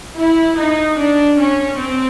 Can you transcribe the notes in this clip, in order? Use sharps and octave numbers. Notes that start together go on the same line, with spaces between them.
E4
D#4
D4
C#4
C4